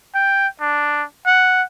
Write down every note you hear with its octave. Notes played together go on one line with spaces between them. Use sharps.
G5
D4
F#5